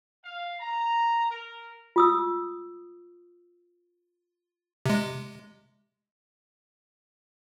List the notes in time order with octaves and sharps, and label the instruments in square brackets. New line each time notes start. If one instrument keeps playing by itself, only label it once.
[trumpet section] F5
A#5
A#4
[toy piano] F4 D#6 E6
[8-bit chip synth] C3 G#3